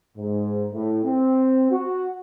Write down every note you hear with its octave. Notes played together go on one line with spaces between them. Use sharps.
G#2
A2
C4
F#4